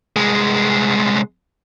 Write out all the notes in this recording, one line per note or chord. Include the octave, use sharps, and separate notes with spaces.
C2 G#3